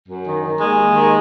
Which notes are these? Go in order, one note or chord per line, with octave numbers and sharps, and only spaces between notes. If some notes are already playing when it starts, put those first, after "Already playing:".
F#2
D#3
D#3
D#2 G#3
D#2
D#3